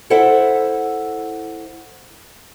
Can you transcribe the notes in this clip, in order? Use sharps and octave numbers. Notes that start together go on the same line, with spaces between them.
E4 A4 C5 E5 F#5